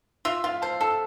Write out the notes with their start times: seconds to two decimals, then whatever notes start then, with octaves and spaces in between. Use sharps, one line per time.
0.25 F4 E5
0.44 F4 F5
0.62 C5 A5
0.81 A4 A5